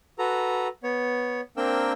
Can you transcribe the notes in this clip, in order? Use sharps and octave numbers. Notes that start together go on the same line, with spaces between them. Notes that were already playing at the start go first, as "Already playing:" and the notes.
F#4 A4 B4 A#5
B3 C#5
A#3 C4 D4 A#4 G5 E6